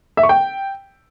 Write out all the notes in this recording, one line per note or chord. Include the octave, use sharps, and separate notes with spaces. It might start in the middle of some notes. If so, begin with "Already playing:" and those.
E5
C#6
G5